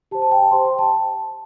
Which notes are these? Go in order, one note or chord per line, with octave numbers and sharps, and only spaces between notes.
G4 C5 A5
A5
G5
A5
G4 C5 C6
G5
A5